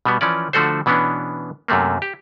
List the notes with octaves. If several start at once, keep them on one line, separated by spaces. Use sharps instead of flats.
B2 G3 B3
E3 F3 C#4 D5
D3 F3 A3 F#4 A4 C5
B2 E3 B3 C#4 D4
F#2 C3 A3 A#3
G4